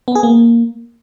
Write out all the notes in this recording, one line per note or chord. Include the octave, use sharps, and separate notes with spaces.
B3
G#4
A#3